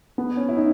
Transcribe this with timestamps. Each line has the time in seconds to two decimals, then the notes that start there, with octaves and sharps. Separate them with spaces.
0.18 B3
0.37 C#4
0.49 E4
0.57 D#4